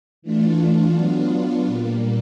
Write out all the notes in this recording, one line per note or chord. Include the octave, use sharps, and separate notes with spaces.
E3 A3 D4 F4
F#3 B3 D4 F4
A#2 G3 A#3